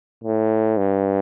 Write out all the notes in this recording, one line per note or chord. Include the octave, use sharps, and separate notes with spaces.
A2
G2